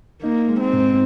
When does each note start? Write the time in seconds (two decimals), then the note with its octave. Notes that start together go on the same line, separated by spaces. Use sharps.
0.23 A#3 D#4
0.48 G#3
0.61 C4
0.73 G#2